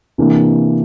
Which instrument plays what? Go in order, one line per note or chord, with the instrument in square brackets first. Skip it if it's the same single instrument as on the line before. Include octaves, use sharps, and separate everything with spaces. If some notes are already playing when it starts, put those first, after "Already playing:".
[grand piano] C3 E3 A#3 D4